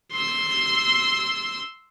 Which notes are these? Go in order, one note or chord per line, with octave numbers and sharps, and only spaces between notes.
C6 E6